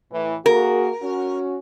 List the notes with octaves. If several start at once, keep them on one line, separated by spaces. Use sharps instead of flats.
A2 E3
A#3 F#4 G#4 A#4
C#4 F#4